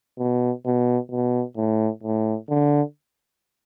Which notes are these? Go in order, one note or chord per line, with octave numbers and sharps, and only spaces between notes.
B2
B2
B2
A2
A2
D3